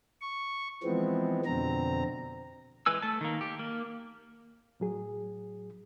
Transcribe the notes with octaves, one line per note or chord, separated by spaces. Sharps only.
C#6
E3 F3 G#3 B3 C4
F2 B2 D3 C4 A#5
E3 G#3 B4 G#5 E6
A3 A5
D#3 A#3
G4
A#3
A2 F#3 G#4